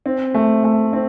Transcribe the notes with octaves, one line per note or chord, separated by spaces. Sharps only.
C4
A3
A3
C4